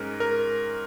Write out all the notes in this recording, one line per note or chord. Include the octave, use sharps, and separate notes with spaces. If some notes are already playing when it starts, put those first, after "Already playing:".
Already playing: G#2 G#3 C#4 A#4
A#4